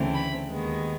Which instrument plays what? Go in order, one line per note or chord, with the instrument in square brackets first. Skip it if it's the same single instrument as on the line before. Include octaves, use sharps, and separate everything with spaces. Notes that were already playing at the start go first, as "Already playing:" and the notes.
Already playing: [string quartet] D2 C#3 E3 A3 C4
B5
D#2 D#3 G#3 B3